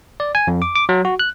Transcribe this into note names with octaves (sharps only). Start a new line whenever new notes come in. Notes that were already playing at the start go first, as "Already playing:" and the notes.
D5
G#5
F2
D6
D6
F#3
F#4
F#6